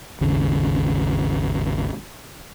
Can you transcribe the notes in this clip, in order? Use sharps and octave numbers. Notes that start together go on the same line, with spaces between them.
G#1 D#2 C#3